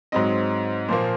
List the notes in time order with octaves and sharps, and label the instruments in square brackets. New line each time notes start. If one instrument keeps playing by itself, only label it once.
[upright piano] G#2 F#3 C4 D#5
A#2 F3 A#3 C5